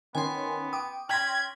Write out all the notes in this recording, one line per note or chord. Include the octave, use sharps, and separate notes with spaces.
D#3 B3 C#4 G#5 C6
G5 D6 D#6
C#4 G5 C6 G#6 A#6 B6 F#7